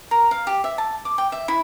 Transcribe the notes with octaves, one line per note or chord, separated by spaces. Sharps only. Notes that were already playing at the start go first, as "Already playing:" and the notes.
A#4
F5
G4
E5
A5
D6
G5
E5
E4